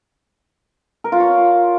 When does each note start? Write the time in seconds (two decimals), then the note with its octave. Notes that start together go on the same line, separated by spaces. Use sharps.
1.04 A#4
1.12 F4
1.20 C#5